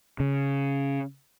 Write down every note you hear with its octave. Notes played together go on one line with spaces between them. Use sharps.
C#3